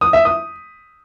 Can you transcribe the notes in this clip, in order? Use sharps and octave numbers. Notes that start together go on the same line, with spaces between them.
D#6
E5
D#6